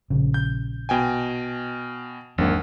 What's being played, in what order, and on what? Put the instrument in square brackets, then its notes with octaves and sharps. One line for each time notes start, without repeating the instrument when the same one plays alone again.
[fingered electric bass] A#1 C#3
[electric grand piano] G6
B2 G5 G#5
[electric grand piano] G#1 A#3 F#5 [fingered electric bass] E2 F#3 D4